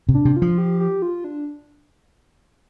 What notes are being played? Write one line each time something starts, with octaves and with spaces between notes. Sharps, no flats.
C3
D4
C3
F4
F3
G4
G4
F4
D4